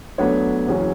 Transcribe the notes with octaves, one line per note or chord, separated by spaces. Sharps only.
D2 D3 F#3 B3 D4 C#5
F#1 E2 C#3 F#3 C#4